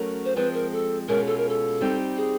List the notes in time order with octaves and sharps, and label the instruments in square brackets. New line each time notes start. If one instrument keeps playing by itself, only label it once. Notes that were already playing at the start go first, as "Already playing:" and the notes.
Already playing: [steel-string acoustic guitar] F#3 A3 C#4 F#4 A#4
[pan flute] C5
[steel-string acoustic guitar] F3 G#3 C4 [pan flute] B4
[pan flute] A#4
A4
[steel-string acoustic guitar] B2 G#3 C#4 F4 [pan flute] A#4
[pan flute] A4
A#4
A4
[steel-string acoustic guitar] G3 C4 D#4 G4
[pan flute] G#4